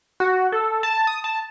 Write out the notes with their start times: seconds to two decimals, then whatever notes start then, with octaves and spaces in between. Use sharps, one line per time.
0.20 F#4
0.52 A4
0.83 A5
1.07 D#6
1.24 A5